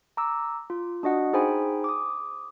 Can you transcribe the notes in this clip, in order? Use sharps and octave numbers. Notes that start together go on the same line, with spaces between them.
A#5 D6 E6
F4
D4 F#4 D#5 F#5
D#4 G#4 C5 G5 G#5 B5
D6 D#6